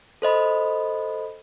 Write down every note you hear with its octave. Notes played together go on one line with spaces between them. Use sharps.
A4 C5 D#5 B5